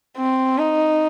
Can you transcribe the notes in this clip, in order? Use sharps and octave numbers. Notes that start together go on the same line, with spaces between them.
C4
D#4